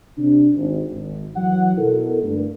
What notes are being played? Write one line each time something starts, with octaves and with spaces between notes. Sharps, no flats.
C3 D4
G#1
G#1
E3 F#3 F#5
B2 E4 A4 A#4
G2 D3 A3